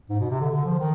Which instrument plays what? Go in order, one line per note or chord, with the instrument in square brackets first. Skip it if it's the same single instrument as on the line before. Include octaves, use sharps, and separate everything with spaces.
[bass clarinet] G#2
B2
C3
D3
D3
F3
D#3